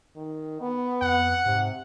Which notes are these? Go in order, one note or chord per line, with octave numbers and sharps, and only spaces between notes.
D#3
B3
F2 F#5
G#2 C3